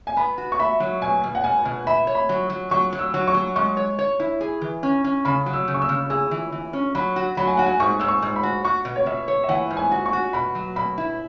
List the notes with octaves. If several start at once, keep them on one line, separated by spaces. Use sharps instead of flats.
G#5
B3 B5
F#4
C#6
E5 B5
F#3
B2 G#5
B2
F#5
B2 G#5
B2
E5 B5
C#5
B5
F#3
F#3
F#3 C#6
F#3
E6
F#3
C#6
F#3
G#3 C#6
C#5
C#5
E4
G#4
E3
C#4
C#4
C#3 B5
F#3
E6
C#3
C#6
E6
C#3
G#4 E6
E3
E3
C#4
F#3 B5
F#4
F#3 B5
G#5
F#4 F#5
G#5
G#2 C#6
G#2 E6
C#6
G#2
B5
F#4
F#4 C#6
B2
C#5
B2 E5
C#5
E5
E3 F#5
G#2
G#5
F#4
C#6
F#4
B2 B5
F#3
B2 B5
E4